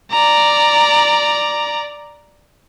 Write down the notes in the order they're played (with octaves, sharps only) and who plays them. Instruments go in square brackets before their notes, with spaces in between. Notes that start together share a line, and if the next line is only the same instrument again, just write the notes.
[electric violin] D5 A#5